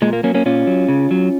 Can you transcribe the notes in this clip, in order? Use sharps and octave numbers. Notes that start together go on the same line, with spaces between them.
A#2 G#3
A#3
F#3 A#3 C#4
A#3 C#4
A#2 C#4 F4
F#3
C#3
F#3